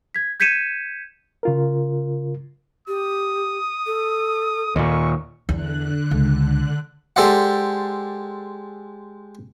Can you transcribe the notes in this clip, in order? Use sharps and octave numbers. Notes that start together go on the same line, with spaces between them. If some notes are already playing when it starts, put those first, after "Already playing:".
G#6 B6
G6 G#6 B6 C#7 D#7 E7
C#3 F4 A#4
G4 D#6
A4
D#2 A#2 C#6
E2 D3 F#6
C#2
G#3 G4 A4 C5 D5 F#5